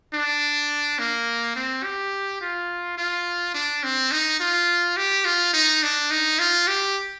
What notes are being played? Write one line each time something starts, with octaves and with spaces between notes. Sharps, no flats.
D4
A#3
C4
G4
F4
F4
D4
C4
D#4
F4
G4
F4
D#4
D4
D#4
F4
G4